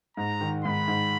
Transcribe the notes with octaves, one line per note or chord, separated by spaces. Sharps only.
G#2 A#5
D#3
G#2 B5
G#2